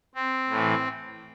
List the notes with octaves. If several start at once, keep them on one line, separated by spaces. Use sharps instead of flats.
C4
A2
E3